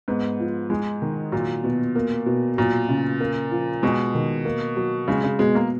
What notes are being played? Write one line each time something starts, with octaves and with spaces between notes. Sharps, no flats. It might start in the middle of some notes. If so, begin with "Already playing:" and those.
G#2 B3
F3
G#3
D#3
A#2 F#3
B2
A#3
B2
A#2 F#3
C#3
A#3
F3
B2 G#3
D#3
A#3
F#3
C#3 G#3
C#3
B2 G#3
A#3